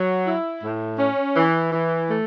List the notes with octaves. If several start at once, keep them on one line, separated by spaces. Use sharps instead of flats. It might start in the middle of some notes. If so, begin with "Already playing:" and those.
Already playing: F#3
E4
A2
C#4
E3
E3
A3